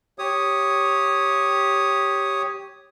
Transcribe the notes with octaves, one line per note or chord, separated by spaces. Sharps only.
G4 C#5 D#6